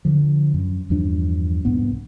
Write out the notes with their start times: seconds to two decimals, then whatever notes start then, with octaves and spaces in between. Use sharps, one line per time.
0.05 D3 F3
0.54 F#2
0.90 E2 G2 F3 D4
1.65 C2 G#2 B3